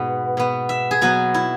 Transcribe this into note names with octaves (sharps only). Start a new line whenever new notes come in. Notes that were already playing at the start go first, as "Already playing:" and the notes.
Already playing: G#2 B2 G#3 B3
B2 B3
E5
G#4
B2 F#3 B3 F#4
E4